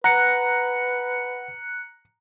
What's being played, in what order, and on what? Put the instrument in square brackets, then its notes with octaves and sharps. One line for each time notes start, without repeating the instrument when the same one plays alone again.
[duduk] B4 [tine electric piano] F#5 [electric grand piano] A#5 [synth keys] F#6 C#7